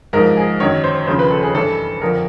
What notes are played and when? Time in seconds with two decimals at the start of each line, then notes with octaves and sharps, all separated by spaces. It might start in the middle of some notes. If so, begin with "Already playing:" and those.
0.13 G#2 F3 A#4
0.37 G#4
0.60 F#2 D#3 F#3 C#5
0.84 C5
1.07 D#2 C#3 F3 C5
1.19 B4
1.31 A4
1.43 G#4
1.54 G2 E3 A4
2.01 F2 D3 F3 A#4